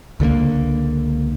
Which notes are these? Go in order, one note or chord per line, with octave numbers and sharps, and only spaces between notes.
C#2 D3 A3 A#3